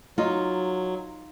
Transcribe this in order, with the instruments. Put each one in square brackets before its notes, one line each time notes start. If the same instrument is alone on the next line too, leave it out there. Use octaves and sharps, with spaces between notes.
[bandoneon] F#3 [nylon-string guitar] D#4 F4